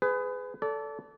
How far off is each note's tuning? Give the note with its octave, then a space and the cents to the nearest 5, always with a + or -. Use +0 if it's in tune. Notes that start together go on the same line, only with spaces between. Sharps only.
G#4 +0 B4 +30
A4 +0 D5 -30